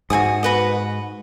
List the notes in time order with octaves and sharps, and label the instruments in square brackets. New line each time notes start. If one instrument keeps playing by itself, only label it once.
[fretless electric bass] G#2 [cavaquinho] F#4 C#5 G#5 D#6
[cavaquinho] F#4 B4 D#5